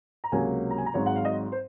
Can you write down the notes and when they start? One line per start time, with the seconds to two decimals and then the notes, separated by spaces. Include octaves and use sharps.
0.24 A#5
0.32 C#2 C3 F#3 A#3 G#5
0.70 A#5
0.78 G#5
0.86 A#5
0.94 G#1 G#2 F#3 C#5
1.06 F#5
1.16 F5
1.25 D#5
1.52 C5